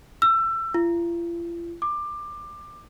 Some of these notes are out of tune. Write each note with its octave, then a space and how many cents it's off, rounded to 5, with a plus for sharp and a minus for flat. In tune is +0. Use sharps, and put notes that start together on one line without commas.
E6 +25
F4 -45
D6 +20